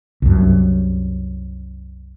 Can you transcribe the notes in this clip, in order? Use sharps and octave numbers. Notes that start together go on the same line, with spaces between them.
C2 F#2